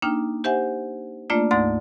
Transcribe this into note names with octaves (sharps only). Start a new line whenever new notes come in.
A#3 D4 D#4 G5 F6
G4 C5 E5 F#5 G#5
A3 A#3 D4 F4 D5
D2 G#2 A3 D#4 D5 A6